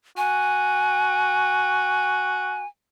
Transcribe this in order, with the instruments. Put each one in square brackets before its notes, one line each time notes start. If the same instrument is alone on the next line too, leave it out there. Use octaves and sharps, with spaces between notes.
[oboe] F#4 [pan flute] G#5